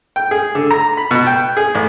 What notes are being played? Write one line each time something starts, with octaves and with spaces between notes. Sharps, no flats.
G5
G#4
D3
A#5
B5
B2
G5
G#4
A1